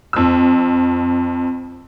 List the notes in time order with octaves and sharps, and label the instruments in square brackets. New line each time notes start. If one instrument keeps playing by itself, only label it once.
[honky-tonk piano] F2 E6